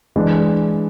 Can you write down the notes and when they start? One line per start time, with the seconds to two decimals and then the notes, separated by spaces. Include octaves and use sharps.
0.16 E3 G#3 D4